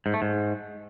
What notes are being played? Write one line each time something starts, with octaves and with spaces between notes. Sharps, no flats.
G#2
A3
G#2